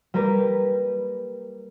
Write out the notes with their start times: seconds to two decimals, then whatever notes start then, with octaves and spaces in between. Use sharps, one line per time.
0.14 G3 A#3 G4 A#4 B4